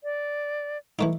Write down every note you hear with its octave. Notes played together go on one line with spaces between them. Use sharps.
D5
E3 A3 D#4